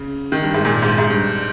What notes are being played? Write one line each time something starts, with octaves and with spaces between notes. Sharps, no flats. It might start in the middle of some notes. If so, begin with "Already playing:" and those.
Already playing: C#3
D#3
G2
G#2
A#2
G#2
G#2
G2